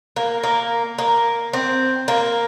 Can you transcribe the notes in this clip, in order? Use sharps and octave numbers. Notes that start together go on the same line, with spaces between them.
A#3
A#3
A#3
C4
A#3